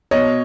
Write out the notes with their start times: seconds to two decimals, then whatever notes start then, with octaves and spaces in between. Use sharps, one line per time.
0.11 B2 C#5 D#5